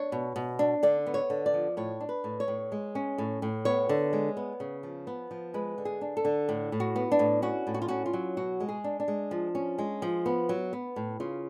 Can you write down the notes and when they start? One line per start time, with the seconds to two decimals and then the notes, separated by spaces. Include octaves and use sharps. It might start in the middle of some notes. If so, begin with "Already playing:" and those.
Already playing: D4 C#5
0.12 B2
0.36 B2
0.59 D4
0.83 D3 D5
1.06 B3
1.14 C#5
1.30 D3
1.46 D5
1.54 F3
1.77 A2 C#5
2.00 D4
2.09 B4
2.24 A2
2.40 C#5
2.48 A2
2.72 G#3
2.95 C#4
3.18 A2
3.42 A2
3.65 B3 C#5
3.89 D3
4.13 G#3
4.37 B3
4.60 C#3
4.83 F3
5.07 B3
5.31 F3
5.54 G#3 B4
5.78 D3
5.85 G#4
6.01 D4
6.17 A4
6.25 D3
6.49 A2
6.72 A2
6.80 F#4
6.96 B3
7.12 D4
7.19 A2
7.42 C#4 F#4
7.67 A2
7.74 F#4
7.82 F4
7.88 C#4 F#4
8.06 F4
8.13 F#3
8.37 B2 F#4
8.60 G#3
8.69 G#4
8.84 D4
9.00 D4
9.08 G#3
9.31 F3
9.55 C#4
9.78 G#3
10.02 F3
10.26 B3
10.49 F#3
10.73 B3
10.96 A2
11.20 C#3 F4